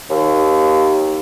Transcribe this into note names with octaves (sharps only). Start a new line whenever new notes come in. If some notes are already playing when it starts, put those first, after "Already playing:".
D#2